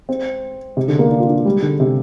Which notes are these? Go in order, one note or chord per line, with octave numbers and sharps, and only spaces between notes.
C4
C3
D3
A#3
D4
F4
D4
G3
D3
C3